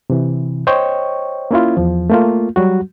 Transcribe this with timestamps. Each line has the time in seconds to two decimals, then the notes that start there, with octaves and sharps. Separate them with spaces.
0.10 C3 E3
0.67 C5 C#5 D#5 G5 C#6
1.51 A#3 C#4 E4 F4
1.77 E2 F3
2.10 A3 A#3 F4
2.56 F#3 G3 F#4